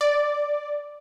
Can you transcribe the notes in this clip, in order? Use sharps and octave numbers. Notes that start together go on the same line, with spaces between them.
D5